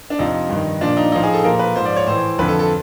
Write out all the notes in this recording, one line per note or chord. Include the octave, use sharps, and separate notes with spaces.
D4
F2 C3 F3 D#4
G2 D#3
A#2 F3 D4
D#4
A2 F3 D#4
G#4
A4
A#2 F3 A#4
B4
G#2 F3 C5
D5
C#5
A2 E3 C5
F2 D3 F3 B4
A4
A4